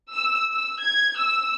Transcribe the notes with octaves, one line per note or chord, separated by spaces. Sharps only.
E6
E6
G#6
E6